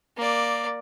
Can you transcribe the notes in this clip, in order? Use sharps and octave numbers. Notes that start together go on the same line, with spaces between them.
A#3 D5